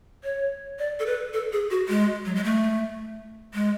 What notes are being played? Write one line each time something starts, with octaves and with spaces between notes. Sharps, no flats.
C#5
D5
A4
B4
A4
G#4
F#4
G#3
F#3
G#3
A3
G#3